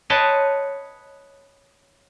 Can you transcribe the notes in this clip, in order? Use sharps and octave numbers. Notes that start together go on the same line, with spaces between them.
B4 C#5 D#5 G5 A5 C6